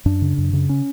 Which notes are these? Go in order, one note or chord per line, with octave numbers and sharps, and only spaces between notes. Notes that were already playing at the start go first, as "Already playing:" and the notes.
F#2 D4
C#3
F#2
C#3
C#4